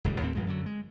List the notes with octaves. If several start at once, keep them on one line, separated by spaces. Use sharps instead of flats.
D#1 C#2 G#2 G3
D#2 A2 C4
A#1 G2 F3 G#3
F#2 D3 F#3
G#3